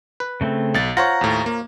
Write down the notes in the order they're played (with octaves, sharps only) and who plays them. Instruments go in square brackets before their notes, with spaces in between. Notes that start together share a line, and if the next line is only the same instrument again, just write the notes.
[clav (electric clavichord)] B4
[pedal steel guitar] C#3 A3 C4
[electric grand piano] B1 A6
[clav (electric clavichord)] F4 C5 C#5 [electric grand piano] F#5 [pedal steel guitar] A#5
[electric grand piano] D#2 A2
A#3